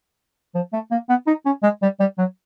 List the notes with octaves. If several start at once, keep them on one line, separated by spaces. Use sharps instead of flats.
F3
A3
A#3
B3
D#4
C#4
G#3
G3
G3
F#3